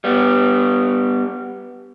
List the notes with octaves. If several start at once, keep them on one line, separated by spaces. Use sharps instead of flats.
G3 B3